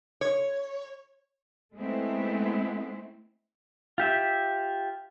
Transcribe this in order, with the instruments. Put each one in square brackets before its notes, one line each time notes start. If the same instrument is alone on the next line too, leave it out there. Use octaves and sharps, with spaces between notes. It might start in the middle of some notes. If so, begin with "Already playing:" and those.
[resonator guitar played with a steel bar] C#5
[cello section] G#3 A3 B3 C4 D#4 E4
[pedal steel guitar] F4 G4 E5